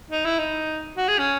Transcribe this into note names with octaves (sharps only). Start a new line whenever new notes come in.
D#4
E4
D#4
F#4
G#4
C#4